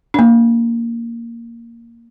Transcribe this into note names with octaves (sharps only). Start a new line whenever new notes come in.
A#3 D4